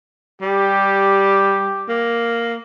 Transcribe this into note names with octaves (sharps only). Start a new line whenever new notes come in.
G3 G4
A#3